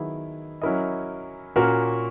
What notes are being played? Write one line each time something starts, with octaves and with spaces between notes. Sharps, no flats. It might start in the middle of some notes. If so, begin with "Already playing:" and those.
Already playing: D#3 F#3 B3 E4 G#4
F#3 C#4 E4 A#4 D#5
A#2 A#3 C#4 F#4 A#4